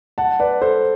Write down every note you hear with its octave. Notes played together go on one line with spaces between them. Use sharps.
F#5 A5
B4 D5
A4 C5